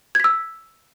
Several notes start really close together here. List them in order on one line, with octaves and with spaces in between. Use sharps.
G#6 B6 E6